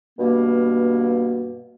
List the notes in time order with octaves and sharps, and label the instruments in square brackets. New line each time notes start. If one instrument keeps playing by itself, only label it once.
[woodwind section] G2 B2 A#3